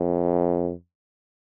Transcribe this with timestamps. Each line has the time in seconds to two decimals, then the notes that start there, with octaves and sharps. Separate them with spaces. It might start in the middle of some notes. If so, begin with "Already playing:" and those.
Already playing: F2